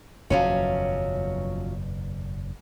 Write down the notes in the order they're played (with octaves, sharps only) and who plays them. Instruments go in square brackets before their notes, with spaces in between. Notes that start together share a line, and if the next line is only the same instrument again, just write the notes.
[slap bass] F#1 E2 B2 [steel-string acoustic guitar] F3 F#3 C#4